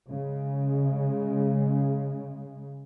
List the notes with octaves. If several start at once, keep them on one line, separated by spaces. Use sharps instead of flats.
C#3 G#3